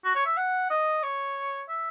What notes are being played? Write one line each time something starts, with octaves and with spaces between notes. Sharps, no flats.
F#4
C#5
E5
F#5
D#5
C#5
E5